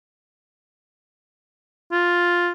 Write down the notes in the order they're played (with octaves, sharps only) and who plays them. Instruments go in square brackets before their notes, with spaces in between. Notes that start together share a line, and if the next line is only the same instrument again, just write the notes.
[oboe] F4